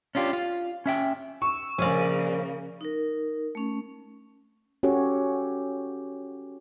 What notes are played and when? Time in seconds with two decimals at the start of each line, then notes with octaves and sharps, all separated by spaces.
0.15 C#4 D4 F4 G4
0.33 F4
0.86 C#4 E5 G5
1.42 C#6 E6
1.79 A#1 C#3 A#3 C#4 D5 F5 G#5
2.81 D#4 A#4
3.55 A3 C#4
4.83 C#4 F#4 G4 A4 C#5